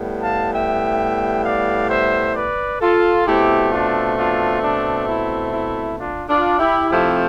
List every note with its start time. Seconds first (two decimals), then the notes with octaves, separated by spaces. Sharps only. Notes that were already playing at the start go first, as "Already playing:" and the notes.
Already playing: A2 G3 B3
0.23 F5 A5
0.53 E5 G5
1.44 D5 F5
1.90 C5 E5
2.35 B4 D5
2.81 F4 A4
3.26 B2 A3 C4 E4 G4
3.72 D4 F4
4.17 D4 F4
4.63 D4
5.08 E4
5.53 E4
5.99 D4 F4
6.29 D4 F4
6.59 E4 G4
6.89 C3 F3 A3 C4 E4 G4